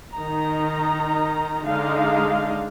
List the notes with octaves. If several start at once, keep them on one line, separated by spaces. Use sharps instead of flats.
D#3 D#4 A#5
D3 G#3 D4 D#4 F5